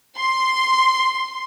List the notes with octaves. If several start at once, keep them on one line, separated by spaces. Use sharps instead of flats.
C6